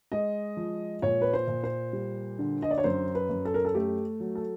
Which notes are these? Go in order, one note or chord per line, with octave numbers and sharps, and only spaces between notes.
G#3 D#5
F3
A#2 C#5
B4
C5
A#2
C5
G3
D3
D#5
D5
C#5
F#2 C5
B4
F#2
A4
A#4
A4
A3 G4
F#3
A4